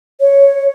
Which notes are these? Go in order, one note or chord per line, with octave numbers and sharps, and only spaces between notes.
C#5